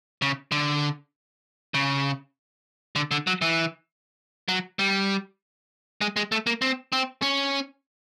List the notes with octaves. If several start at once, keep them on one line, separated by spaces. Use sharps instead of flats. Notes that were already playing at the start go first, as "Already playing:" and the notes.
C#3
D3
C#3
D3
D3
F#3
E3
F#3
G3
G#3
G#3
A3
A#3
C4
C4
C#4